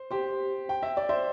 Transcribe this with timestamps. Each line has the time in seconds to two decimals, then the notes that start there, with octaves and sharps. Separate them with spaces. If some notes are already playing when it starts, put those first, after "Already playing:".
Already playing: C5
0.11 G4 C5
0.69 G5
0.83 E5
0.97 D5
1.09 C5 E5